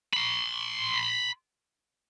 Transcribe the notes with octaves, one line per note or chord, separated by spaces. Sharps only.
B5 C6